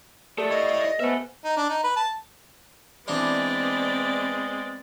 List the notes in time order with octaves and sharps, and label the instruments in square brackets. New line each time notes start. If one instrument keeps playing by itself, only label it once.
[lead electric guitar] A3 [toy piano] G4 A4 A#4 [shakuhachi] D5
[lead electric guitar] E4 C#5 [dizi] D#5
[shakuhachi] B3 [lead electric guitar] A4 E5 [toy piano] B4 C5 G#5
[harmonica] D#4
D4
D#4
B4
A5
[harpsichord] E3 D4 D#4 [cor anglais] G#3 [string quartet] B3 C4 D5